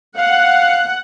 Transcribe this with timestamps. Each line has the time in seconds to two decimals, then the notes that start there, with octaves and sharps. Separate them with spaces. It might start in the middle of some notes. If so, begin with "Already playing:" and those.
0.18 F5 F#5